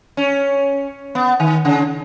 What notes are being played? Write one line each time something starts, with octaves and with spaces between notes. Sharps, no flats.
C#4
B3
D#3
C#3